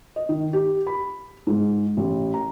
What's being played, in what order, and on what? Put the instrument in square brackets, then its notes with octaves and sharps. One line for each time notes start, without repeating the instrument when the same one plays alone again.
[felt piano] D#5
D#3
G4
B5
G#2
A1
A#5